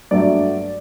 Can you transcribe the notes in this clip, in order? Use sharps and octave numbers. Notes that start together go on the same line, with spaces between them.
G2 F#3 A3 D5